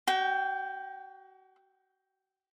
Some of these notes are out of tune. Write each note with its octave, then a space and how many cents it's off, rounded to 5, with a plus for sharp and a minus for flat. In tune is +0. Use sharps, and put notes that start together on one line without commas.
F#4 +35 G5 +0